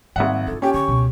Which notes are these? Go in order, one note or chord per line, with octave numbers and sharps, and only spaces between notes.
G#1 G#2 G3 E5 F#5
D4 F4 A4
C#4 G4 G5
D3 C#6
C#2 B2